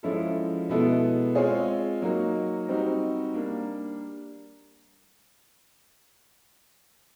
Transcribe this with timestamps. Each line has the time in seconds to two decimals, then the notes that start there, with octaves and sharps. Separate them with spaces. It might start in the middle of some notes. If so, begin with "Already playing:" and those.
0.03 F3 G#3 C#4 E4 A4
0.69 B2 G#3 B3 E4 A4
1.35 G#3 C4 F4 G#4 C#5
2.02 F#3 A#3 D#4 F#4
2.68 G3 C4 D#4 F#4
3.34 G3 A#3 D4